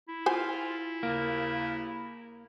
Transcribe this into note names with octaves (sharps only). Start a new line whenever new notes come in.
E4
F4 C5 G#5
D#2 C#3 A#3